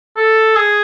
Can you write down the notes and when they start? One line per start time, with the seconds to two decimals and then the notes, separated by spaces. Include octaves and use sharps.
0.17 A4
0.56 G#4